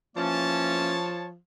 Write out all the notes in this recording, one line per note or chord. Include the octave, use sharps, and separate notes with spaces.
E3 F3 A#3 C#4 C#5 A5